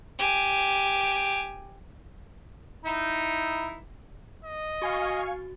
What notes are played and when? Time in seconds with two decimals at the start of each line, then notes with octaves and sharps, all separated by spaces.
0.19 G4 G#5
2.85 D#4 E4
4.44 D#5
4.82 F#4 F5 G#5 C#6